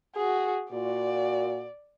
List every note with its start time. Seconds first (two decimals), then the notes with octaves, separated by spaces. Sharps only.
0.15 F#4 G#4
0.72 A#2 F#4 D5